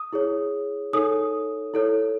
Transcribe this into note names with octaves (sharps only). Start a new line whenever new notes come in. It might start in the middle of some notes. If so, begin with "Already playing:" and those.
Already playing: D#6
E4 G#4 C#5
D#4 A4 C#5 D#6
E4 A4 C#5